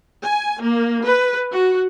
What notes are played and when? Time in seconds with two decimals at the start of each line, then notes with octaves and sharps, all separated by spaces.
0.23 G#5
0.61 A#3
1.04 B4
1.51 F#4